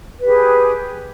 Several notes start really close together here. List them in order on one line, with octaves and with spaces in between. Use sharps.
B4 G4 G#4